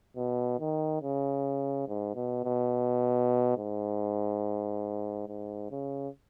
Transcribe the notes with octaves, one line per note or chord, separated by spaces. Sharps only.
B2
D#3
C#3
G#2
B2
B2
G#2
G#2
C#3